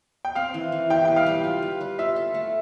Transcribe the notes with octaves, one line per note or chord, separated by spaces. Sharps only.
G5
C4 F5
E3
E3
G4 G5
B4 G5
F5
G3
F4
B4
G3
F4 E5
A4
A3